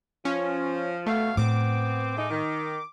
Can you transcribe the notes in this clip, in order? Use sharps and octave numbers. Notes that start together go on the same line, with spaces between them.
F3 C#4
B2 A3 C#5 F5
A2 B3 C4 D6
G#3 A3 D#4
D#3